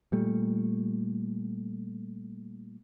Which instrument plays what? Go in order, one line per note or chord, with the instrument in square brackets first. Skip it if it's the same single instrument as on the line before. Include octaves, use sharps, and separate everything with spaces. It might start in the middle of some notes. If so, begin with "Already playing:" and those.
[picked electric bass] A#2 G3 A3